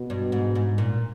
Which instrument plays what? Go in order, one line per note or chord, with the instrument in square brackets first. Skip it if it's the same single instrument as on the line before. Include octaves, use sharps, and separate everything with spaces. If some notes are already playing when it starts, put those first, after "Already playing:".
Already playing: [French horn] B2
[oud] G2
G#2
G#2
A#2